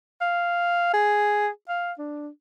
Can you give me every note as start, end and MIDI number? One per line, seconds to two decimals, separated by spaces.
0.21 0.89 77
0.93 1.48 68
1.68 1.92 77
1.99 2.28 62